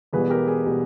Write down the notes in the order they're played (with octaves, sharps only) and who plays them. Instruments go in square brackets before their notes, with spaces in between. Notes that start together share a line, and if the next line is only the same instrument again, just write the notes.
[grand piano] E1 E2 B2 G3 G#4 B4
G4 A#4
G#4
B2 G3